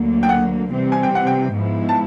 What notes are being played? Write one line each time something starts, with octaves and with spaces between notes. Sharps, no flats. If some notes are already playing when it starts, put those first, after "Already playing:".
Already playing: D2 D3 F#3 A#3
G5
F#5
C3 E3 G3 C4
G#5
G5
F#5
G5
G#2 F3 G#3 B3 E4
A5